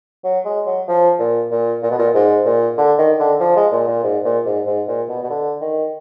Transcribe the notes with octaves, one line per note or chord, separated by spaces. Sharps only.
F#3
G#3
F#3
F3
A#2
A#2
A#2
B2
A#2
G#2
A#2
D3
D#3
D3
F3
G#3
A#2
A#2
G#2
A#2
G#2
G#2
A#2
B2
B2
D3
D#3